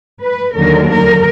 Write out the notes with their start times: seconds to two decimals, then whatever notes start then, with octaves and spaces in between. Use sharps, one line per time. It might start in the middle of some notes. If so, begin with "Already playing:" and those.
0.21 B4
0.55 D#2 D3 F#3 A#4
0.90 A#4